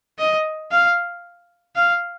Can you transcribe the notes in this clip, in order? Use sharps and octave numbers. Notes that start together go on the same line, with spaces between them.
D#5
F5
F5